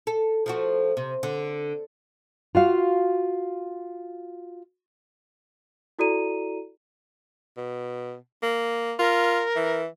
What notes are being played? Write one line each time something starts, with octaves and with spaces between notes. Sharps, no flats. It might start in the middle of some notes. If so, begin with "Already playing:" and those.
A4
F3 A3 F#4
C3
D3
F4 F#4 F5
E4 F#4 A4 D5 A#5 D#7
B2
A#3
F4 A#4
E3